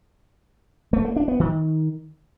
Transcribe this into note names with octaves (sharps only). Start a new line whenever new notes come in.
A3
A#3
D4
B3
D#3